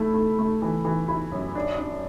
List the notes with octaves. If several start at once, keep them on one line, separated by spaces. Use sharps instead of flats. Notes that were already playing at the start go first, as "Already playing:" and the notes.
Already playing: A3 E4
A3
A3
E3
E3
E4
F#2
D4
D4